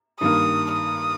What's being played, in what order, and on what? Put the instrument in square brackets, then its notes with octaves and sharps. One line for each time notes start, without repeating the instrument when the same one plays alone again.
[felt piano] G2 D#3 A#3 [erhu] D#6
[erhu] D#6